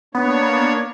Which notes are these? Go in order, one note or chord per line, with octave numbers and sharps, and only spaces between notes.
A#3 B3 D4 C#5